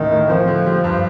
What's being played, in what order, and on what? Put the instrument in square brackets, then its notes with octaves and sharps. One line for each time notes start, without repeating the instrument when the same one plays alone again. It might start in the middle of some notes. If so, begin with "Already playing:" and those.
Already playing: [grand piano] A1 [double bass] D#3
[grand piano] A2
[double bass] F3 [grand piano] C4
[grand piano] D3
G3
G2